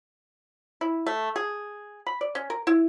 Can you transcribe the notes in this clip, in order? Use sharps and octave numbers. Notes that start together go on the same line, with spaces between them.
E4
A3
G#4
B5
D5
C#4
A#4
E4